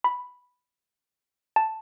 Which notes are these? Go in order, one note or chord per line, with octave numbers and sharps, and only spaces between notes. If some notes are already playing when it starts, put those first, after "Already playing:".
B5
A5